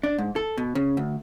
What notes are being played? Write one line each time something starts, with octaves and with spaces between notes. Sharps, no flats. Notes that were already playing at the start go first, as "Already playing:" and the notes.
D4
G#2
A4
B2
C#3
D2